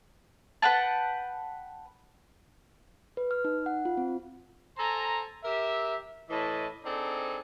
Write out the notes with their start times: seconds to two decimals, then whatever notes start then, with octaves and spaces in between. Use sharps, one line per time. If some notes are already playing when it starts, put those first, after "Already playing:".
0.62 B4 F#5 G5 A5
3.17 B4
3.31 F6
3.45 D#4
3.66 F#5
3.85 F4
3.97 C4
4.77 A4 C5 G#5 A#5
5.44 G4 A#4 E5
6.30 A2 E3 E4 D#5 A5
6.84 C4 D4 D#4 G#4 A4